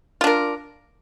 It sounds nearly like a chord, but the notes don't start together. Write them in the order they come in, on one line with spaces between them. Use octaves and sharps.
F4 D4 A#4